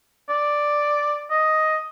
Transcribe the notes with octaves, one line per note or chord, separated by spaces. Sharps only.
D5
D#5